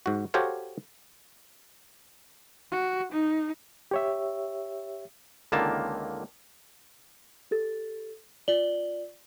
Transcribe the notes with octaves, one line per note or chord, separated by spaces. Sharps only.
G#2 F#4
F#4 G4 A4 C5 C#5 F5
F#4
D#4
G4 C#5 E5
C#2 D3 D#3 A#3 A5
G4 A4 A6
F4 D5 F#7 G7